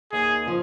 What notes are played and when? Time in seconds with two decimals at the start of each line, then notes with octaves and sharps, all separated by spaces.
0.13 D#2 G#4
0.45 C#3 F3